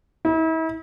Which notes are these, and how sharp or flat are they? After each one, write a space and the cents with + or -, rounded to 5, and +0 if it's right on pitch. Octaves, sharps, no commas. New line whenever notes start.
E4 -40